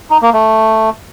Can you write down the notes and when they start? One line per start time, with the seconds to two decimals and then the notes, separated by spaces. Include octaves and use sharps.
0.11 D#4
0.22 A#3
0.34 A3